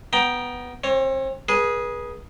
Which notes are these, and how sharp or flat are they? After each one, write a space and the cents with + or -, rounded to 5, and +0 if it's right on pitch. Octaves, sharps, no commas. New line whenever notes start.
B3 +0 G5 +0 A#5 +20
C4 +35 C#5 +0
G#4 +0 B4 -35